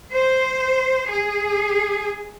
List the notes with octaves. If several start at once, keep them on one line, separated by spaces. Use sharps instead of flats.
C5
G#4